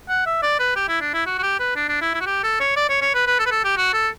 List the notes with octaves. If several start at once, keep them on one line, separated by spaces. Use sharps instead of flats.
F#5
E5
D5
B4
G4
E4
D4
E4
F#4
F#4
G4
B4
D4
D4
E4
E4
F#4
G4
A4
C#5
D5
C#5
C#5
B4
B4
A4
B4
A4
G4
F#4
A4